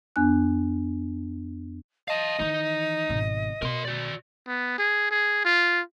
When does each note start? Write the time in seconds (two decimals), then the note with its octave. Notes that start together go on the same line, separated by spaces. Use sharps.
0.16 F2 B3 D4 G#5 F#6
2.08 D#5 F5 A5
2.39 D#3 E3 D#4
3.09 G#1 B2
3.62 B2 A#4 C6
3.85 F#4 D5
4.48 B3
4.78 G#4
5.11 G#4
5.45 F4